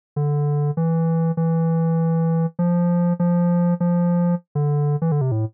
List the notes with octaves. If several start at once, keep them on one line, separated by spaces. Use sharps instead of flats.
D3
E3
E3
F3
F3
F3
D3
E3
D3
C3
A2